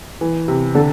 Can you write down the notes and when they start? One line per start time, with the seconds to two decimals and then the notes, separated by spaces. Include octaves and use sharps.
0.21 E3
0.48 C3
0.75 D3 A4